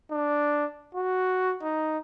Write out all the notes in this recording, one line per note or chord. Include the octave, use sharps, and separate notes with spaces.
D4
F#4
D#4